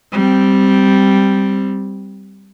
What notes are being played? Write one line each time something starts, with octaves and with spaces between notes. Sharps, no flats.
G3 C4